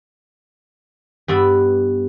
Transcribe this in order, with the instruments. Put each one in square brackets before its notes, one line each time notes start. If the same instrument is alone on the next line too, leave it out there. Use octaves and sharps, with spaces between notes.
[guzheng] G2 B3 D5 E5 B5